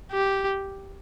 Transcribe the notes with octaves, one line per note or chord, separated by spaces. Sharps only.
G4